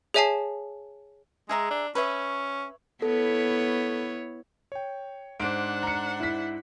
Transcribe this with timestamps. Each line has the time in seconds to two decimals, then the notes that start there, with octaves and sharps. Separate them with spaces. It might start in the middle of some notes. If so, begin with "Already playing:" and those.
0.14 G#4 C#5 E5 G#5 A5 C7
1.49 G#3 G#4 E5 A#5
1.70 D4
1.95 C#4 B4 C#5 E5
3.02 B3 E4 A4 C#5
4.72 C#5 G5
5.40 G#2 D4 C5 F#5 D7
5.83 A#5 C#7
6.20 E4 B6